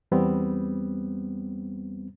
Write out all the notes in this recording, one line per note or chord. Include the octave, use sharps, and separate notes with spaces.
E2 G3 B3 C4